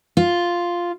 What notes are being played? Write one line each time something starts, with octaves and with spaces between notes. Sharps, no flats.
F4